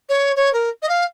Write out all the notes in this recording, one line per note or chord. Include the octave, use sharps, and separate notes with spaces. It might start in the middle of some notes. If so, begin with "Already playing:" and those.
C#5
C#5
A#4
D#5
F5